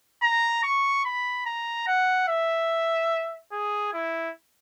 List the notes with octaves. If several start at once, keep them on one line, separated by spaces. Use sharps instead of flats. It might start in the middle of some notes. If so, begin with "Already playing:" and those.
A#5
C#6
B5
A#5
F#5
E5
G#4
E4